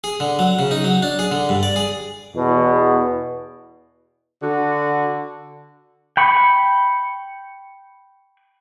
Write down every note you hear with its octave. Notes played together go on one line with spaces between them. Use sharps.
G#4
D3
F#3
C#3
D#4
F#3
D4
G#4
D3
G2
D5
G#4
E2 B2
D3 F#4
G5 B5 C#6